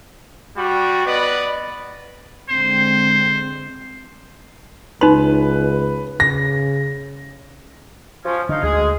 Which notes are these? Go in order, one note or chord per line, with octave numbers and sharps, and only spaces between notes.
G3 F#4
B3 B4 D5 D#5
D3 G#3 C4 C5
C#2 D#4 B4 C6
C#3 A#6
F3 C#4
D3 D#4 F5
D2 G#3 G#4